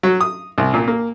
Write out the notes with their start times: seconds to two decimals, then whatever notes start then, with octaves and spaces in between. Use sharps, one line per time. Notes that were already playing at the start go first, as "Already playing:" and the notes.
0.03 F#3
0.21 D#6
0.58 C2
0.74 A#2
0.88 A#3